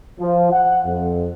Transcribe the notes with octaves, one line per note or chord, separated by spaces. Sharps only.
F3
F#5
F2